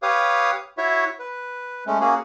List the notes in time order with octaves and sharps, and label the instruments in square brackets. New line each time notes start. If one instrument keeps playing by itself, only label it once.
[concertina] G4 B4 C#5 F5 D#6
E4 F#4 C#5 E5
B4
G#3 A3 C#4
A#3 C#4 F#4 G#4